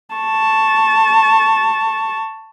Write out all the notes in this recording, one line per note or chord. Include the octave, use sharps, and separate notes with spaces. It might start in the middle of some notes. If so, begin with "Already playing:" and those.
A5 C#6